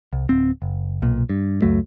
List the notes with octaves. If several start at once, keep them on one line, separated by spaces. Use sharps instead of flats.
C2
D1 C4
F#1
B1 A#2
G2
C#2 F#2 F#3 A3